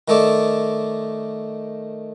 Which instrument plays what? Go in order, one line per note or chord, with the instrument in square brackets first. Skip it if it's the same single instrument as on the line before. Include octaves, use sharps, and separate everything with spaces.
[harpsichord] D#3 A3 D#4 A4 D5